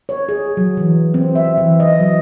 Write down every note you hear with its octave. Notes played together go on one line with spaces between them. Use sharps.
C#5
G#4
F#3
E3
C4
E5
E3
D#5
F#3